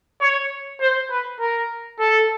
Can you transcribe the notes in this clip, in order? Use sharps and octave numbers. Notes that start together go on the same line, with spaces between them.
C#5
C5
B4
A#4
A4